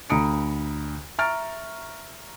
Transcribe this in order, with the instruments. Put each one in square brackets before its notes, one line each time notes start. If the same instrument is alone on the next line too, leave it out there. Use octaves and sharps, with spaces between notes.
[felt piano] D2 A#5 B5 D#6 C#7 D7
E5 A#5 C#6 F6 A6 D7